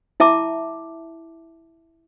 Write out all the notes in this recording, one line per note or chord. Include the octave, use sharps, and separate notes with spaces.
E4 E5 A5 D6